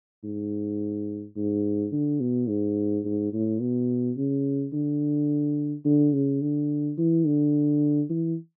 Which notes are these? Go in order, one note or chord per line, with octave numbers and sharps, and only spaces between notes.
G#2
G#2
D3
B2
G#2
G#2
A2
B2
C#3
D3
D3
C#3
D3
E3
D3
E3